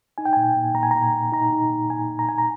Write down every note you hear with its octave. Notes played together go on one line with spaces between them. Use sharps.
D#4 G#5
G5
A#2 G#5
A#2
A#2 A#5
G#5
A#2 A#5
A#2
D#4 A#5
D#4
A#2
A#2 G#5
A#2
A#5
A#2 G#5
A#5